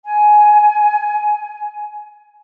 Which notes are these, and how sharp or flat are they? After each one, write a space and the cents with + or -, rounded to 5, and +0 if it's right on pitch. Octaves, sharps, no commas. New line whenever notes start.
G#5 +15